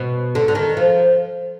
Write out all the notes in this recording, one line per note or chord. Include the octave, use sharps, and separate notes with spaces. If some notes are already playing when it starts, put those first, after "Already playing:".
Already playing: B2
D3
D3
D#3
F3